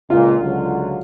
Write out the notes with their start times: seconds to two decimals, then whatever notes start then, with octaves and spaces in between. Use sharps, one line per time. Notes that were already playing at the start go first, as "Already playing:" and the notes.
0.10 C#2 A#2 F4
0.41 C#2 D3 F#3